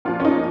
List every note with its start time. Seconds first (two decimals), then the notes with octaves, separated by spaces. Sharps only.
0.05 A#2 F3 F4
0.20 C#4
0.25 D#4